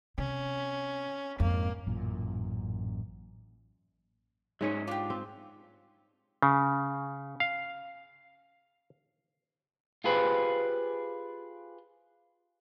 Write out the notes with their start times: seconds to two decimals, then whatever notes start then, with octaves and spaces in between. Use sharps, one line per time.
0.18 C3 C#4
1.40 F2 G#2 A#3
1.87 A1 F#2 A#2
4.61 G#2 F#3 C#4 D#4 G#4 C#5
4.88 D4 F4 G4
5.10 C4
6.43 C#3
7.40 F5
10.04 F4 G4 G#4 B4 C5